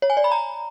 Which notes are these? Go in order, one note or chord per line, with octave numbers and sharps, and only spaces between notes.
C#5
G#5
D5
B5
A#5